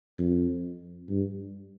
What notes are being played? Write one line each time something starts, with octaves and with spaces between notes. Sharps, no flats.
F2
G2